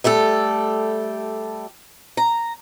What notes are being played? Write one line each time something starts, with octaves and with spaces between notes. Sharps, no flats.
G3 A3 G4 A4
A#5